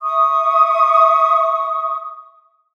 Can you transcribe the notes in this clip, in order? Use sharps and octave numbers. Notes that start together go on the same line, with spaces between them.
E5 C#6 D#6